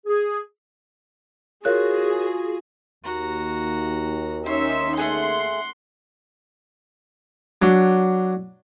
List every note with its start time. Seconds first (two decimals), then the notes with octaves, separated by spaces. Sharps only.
0.06 G#4
1.65 F4 F#4 G#4 A#4 C#5 F#6
3.04 D#2 F#4 A#5
4.46 C#4 D#4 C#5 E5 C6
4.97 A3 B3 G#4 F#5 C6
7.62 F#3 D4